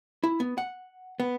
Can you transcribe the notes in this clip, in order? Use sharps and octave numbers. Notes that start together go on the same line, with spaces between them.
E4
B3
F#5
B3